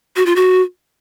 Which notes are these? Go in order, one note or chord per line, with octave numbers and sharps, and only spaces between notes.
F#4
F4
F#4